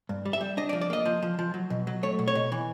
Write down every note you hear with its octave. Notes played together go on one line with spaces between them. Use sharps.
G2
G3
E5
G3
D4 D#5
D5
F3
D5
A#3 D#5
F3
F3
F3
F#3
B2
F#3
A3 C#5
B2
C#5
B2
E3